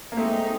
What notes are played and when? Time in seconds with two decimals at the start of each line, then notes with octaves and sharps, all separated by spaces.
0.12 A#3
0.17 G#3 A3 C4 D#4